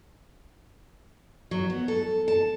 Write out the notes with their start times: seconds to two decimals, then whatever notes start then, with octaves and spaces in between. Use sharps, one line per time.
1.51 F#3
1.70 B3
1.88 A4
2.28 A5